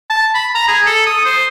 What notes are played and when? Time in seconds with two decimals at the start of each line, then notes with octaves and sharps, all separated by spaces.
0.10 A5
0.35 B5
0.55 A#5
0.68 G#4
0.86 A4
1.06 D#6
1.25 C5